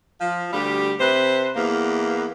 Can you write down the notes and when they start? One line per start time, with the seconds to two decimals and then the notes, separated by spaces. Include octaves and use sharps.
0.20 F3
0.53 D2 G3 G4
1.00 C3 B4 C5
1.55 E2 A#3